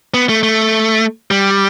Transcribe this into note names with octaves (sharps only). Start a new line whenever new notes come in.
B3
A3
A3
G3